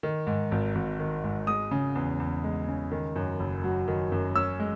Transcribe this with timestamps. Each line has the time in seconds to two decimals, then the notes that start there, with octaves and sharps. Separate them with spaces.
0.03 D#3
0.27 G#2
0.51 G#1
0.75 G#1
0.99 D#3
1.24 G#2
1.47 G#3 D#6
1.71 C#3
1.95 E2
2.20 E2
2.44 G#3
2.68 C#3
2.92 D#3
3.16 F#2
3.40 F#1
3.64 F#3
3.88 D#3
4.12 F#2
4.35 C#4 E6
4.60 G#3